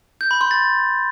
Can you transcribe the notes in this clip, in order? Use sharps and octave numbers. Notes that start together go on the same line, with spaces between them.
G6
B5
C6
A6